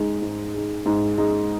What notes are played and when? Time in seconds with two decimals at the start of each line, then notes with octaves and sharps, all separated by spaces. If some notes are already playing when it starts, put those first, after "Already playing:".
Already playing: G#2 G#3 D#4
0.22 G#2
0.54 G#3 D#4
0.86 G#2
1.18 G#3 D#4